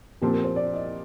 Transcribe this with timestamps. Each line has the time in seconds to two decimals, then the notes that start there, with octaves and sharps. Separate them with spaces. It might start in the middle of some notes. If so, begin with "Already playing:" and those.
0.21 A#2 F3 C4 G4
0.34 A#4
0.44 C5
0.56 D5
0.74 D#5